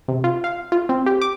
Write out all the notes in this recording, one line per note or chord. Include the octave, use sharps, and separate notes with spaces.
C3
F4
F5
F4
C4
G4
D6